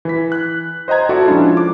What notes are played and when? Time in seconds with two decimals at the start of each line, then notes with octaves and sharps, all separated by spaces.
0.05 E3 B6
0.32 F#6
0.88 C5 D#5 G5 A#5 G#6
1.09 F4 F#4 A4 D5 E5
1.26 F3 G#3 C#4 D4 E4 F4
1.57 D6